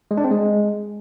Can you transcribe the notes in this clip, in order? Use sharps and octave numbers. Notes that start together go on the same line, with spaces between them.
G#3
D4
C4
G#3